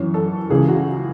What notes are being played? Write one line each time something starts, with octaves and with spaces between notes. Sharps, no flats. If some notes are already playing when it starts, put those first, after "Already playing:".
Already playing: F#2 E3 C#5
A4
C#2 C#3 E3 G#4
F#4